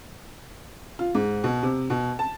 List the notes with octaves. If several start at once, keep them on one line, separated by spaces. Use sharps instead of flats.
F4
G#2
B2
C3
B2
A5